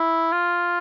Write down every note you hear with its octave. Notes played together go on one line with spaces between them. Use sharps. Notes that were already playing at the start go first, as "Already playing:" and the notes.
Already playing: E4
F4